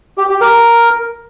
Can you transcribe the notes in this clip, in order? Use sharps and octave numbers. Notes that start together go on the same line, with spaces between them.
G4
G4
A#4